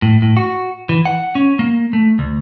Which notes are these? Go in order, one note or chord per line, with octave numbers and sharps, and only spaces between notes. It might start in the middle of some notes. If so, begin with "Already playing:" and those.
A2
A2
F#4
E3
F#5
C#4
A#3
A3
D2